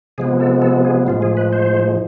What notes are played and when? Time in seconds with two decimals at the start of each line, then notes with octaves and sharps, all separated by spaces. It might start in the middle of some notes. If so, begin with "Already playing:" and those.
0.18 C3 F3 G#3 B3 G#4
0.40 A4
0.62 A4
0.84 G#4
1.07 A2 F3 G#3 F4
1.22 G#4
1.37 B4
1.53 C5